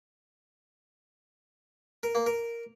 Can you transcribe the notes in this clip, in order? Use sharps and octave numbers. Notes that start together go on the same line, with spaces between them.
A#4
A#3
A#4